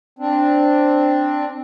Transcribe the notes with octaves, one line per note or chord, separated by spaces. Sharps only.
C4 D4